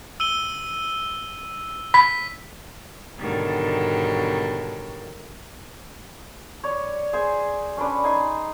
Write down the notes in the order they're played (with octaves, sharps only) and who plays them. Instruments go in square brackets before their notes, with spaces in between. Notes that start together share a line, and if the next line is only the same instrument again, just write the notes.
[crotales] E6 D#7 G7
[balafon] B5 [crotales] B6
[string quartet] G#2 B2 D3 D#3 F#3 G3
[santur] C#5 D5
G#4 C5 G#5
C#4 D4 B4 D5
D#4 G#5 C6